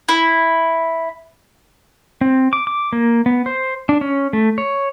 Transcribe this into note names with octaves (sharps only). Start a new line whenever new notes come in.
E4
C4
D6
D6
A#3
B3
C5
D4
C#4
A3
C#5